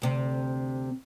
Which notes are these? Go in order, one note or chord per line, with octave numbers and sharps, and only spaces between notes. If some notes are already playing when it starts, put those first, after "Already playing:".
D2 C3